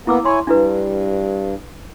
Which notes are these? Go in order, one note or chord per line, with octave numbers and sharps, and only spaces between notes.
A#3 B3 E4 D6 E6
E4 C#5 G#5 C6
G2 D4 E4 B4